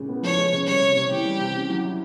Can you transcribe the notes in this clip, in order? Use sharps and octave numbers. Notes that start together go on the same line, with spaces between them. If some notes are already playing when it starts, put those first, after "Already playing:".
Already playing: A#2 C#3 G#3
B3
F3 C#5
G#3
C#3
G3 C#5
C3
C3
E3 G4
G3
C3
C#4
F#3
E4